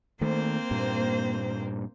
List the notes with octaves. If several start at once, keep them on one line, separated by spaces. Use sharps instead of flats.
D#3 A3 A#3 C4 C5
G2 A#2